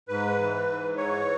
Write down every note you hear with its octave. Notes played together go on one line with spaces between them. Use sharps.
G#2 B4
E3
G#2
E3 C#5